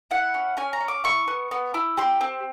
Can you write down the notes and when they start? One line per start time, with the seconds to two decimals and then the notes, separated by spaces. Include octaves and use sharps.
0.11 E4 F#5
0.34 C#4
0.57 C#4 G#5
0.73 A#5
0.80 C#4
0.88 D6
1.04 E4 C#6
1.28 B3
1.51 B3
1.74 E4
1.97 G4 C6
2.21 C4